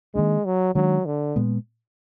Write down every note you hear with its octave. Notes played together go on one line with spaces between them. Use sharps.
D#3 G#3 A#3 D4
F#3
D#3 F#3 G#3 D4
D3
A#2 G#3 B3